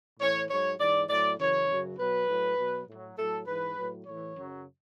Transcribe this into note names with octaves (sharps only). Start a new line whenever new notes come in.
A2 E3 C#5
G#2 F#3 C#5
G#2 E3 D5
A2 F#3 D5
F#2 C#3 E3 C#5
F#2 C#3 F#3
B2 F#3 B4
A2 F#3
B2 F#3
A2 F#3
A2 F#3 A4
G#2 E3 B4
A2 F#3
A2 E3 C#5
F#2 C#3 F#3